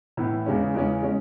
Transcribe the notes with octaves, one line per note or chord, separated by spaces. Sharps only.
A2 E3 B3 E4
E2 C#3 G#3 C#4
E2 C#3 G#3 C#4
G#3 C#4